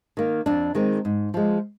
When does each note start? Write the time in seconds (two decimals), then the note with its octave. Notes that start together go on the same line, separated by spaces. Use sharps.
0.17 D#3 A#3
0.46 F2 D4
0.75 D#3 G#3 C4
1.05 G#2
1.34 F3 G#3